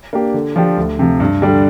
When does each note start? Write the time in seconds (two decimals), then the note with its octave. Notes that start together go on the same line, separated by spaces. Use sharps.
0.13 A#3 D4 G4
0.34 D3
0.56 F3 D4 G4
0.77 D2
0.99 C3 F3
1.20 G2
1.42 D3 G3 D4